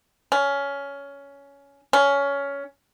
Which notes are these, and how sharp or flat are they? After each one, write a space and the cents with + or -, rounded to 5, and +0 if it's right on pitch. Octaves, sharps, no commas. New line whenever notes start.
C#4 +15
C#4 +15